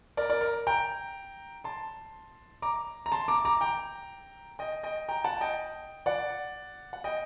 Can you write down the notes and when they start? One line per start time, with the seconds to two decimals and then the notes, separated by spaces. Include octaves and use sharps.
0.17 A#4 D5
0.30 A#4 D5
0.41 A#4
0.67 G5 A#5
1.64 A5 C6
2.62 A#5 D6
3.06 A#5
3.12 A5 C6
3.28 A#5 D6
3.45 A#5 D6
3.61 G5 A#5
4.59 D#5 G5
4.83 D#5 G5
5.09 G5 A#5
5.24 F#5 A5
5.41 D#5 G5
6.06 D5 F#5
6.93 F#5
7.04 D#5 G5